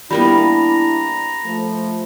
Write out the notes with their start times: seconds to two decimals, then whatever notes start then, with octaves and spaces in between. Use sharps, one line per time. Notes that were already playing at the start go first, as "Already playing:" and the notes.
0.11 G3 A#3 B3 D4 E4 A#5 B5
1.45 F3 A3